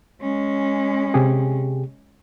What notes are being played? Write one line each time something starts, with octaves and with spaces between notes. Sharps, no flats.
G#3 C#4
C3 G4 G#4